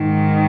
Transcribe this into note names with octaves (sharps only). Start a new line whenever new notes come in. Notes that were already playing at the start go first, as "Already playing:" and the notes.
Already playing: G#2 D#3